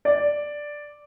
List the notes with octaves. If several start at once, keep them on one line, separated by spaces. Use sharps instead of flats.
D5